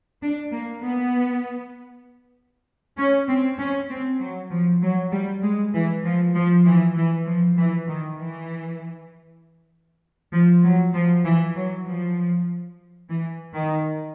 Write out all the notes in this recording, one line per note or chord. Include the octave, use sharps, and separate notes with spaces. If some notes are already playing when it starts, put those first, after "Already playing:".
D4
A#3
B3
C#4
C4
C#4
C4
F#3
F3
F#3
G3
G#3
E3
F3
F3
E3
E3
F3
E3
D#3
E3
F3
F#3
F3
E3
F#3
F3
E3
D#3